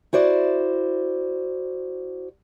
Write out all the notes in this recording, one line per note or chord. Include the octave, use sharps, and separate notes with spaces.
E4 F#4 C5 D5